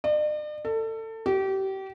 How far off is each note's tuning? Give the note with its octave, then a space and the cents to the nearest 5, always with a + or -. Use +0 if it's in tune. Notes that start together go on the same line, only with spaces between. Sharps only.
D5 +45
A4 +25
G4 -30